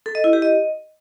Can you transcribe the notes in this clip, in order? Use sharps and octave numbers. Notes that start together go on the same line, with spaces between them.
A4
D#5
E4
G4
D#5